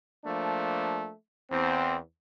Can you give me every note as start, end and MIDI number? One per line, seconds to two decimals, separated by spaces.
0.25 1.10 53
0.25 1.10 57
0.25 1.10 58
0.25 1.10 62
1.50 1.97 40
1.50 1.97 60